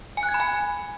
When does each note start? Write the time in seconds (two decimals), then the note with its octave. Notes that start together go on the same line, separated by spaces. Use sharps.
0.17 G#5
0.23 F#6
0.29 G#6
0.34 B5
0.40 G#5